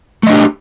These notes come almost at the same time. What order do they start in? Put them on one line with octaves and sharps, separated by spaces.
A3 D#5 D4 G4